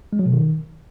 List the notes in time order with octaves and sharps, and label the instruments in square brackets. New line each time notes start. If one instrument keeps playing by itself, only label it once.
[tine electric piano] G#3
F#3
B2
D#3